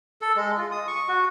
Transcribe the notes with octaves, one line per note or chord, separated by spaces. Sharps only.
A4
G#3
F4
D#6
C#6
F#4